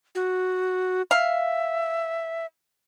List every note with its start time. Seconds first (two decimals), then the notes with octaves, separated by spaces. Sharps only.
0.15 F#4
1.11 E5 F5